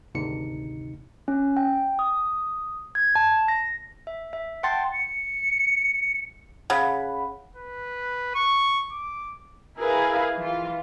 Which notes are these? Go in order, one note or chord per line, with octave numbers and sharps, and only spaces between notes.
G#1 D2 C3 D#4 C#7
C#4
G5
D#6
G#6
A5
A#6
E5
E5
F#5 G5 A5 C6 A6
C#7
C#3 F#5 B5
B4
C#6
D6
E4 G#4 A#4 B4 F5
E3 F4